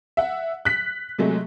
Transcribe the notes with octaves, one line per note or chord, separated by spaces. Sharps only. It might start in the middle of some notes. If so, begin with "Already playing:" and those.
E5 F#5
F#6 B6
C3 F#3 G#3 A3